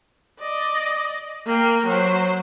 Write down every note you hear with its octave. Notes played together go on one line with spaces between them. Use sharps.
D5 D#5
A#3 G5
F#3 C5